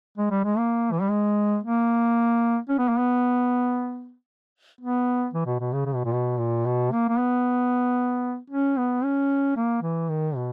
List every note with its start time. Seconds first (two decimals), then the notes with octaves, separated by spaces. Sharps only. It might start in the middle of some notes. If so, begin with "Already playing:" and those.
0.18 G#3
0.31 G3
0.44 G#3
0.57 A#3
0.92 E3
1.01 G3
1.10 G#3
1.63 A#3
2.69 C#4
2.79 B3
2.89 A#3
2.98 B3
4.81 B3
5.34 E3
5.46 B2
5.60 B2
5.73 C#3
5.86 C#3
5.95 B2
6.05 A#2
6.13 B2
6.39 A#2
6.66 B2
6.92 A#3
7.09 A#3
7.18 B3
8.50 C#4
8.77 B3
9.04 C#4
9.57 A#3
9.82 E3
10.09 D#3
10.36 B2